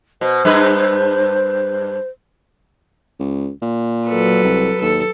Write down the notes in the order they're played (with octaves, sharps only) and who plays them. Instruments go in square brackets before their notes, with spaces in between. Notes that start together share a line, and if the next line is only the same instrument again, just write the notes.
[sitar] B2 [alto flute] C5
[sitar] G2 B4
[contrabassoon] C#2
A#2
[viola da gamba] F#3 A4 B4
[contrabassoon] C2
[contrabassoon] D#2 [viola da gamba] A4